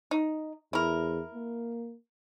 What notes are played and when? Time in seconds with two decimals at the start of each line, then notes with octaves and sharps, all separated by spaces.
0.11 D#4
0.73 E2 E4 A#4
1.34 A#3